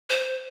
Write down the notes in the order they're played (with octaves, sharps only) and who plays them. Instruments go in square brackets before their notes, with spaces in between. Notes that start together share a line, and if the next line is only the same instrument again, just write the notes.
[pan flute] C5